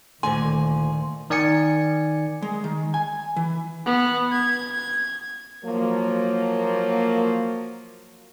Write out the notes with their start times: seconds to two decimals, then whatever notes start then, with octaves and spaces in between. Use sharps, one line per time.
0.23 D2 A#2 D#3 G#5 C6
1.30 D#3 D5 G#5 C#7
2.42 G#3
2.64 D#3
2.94 G#5
3.36 E3
3.86 B3
4.32 G#6
5.65 F3 F#3 A#3